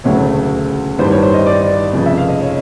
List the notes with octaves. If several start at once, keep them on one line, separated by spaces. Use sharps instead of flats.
E1 D2 C#3 F#3 A3 C#5
A1 G2 D#3 G3 C5
C#5
C5
D#5
D5
F1 F2 C#3
E5
F5
D#5
C#5